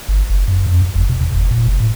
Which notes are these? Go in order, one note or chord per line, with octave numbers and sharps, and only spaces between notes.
G1
F#1
F#2
F2
F2
F#1
B2
E2
F#1
A#2
F#1
A2